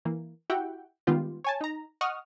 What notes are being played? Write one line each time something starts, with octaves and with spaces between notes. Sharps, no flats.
E3 A#3
E4 F#4 G4 E5 F#5 G5
D#3 G3 G#3 B3 F4 G4
C#5 G#5 A5
D#4 A#5
D#5 F#5 C#6 D#6 F6